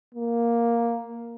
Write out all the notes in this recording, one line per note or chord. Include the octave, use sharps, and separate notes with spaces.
A#3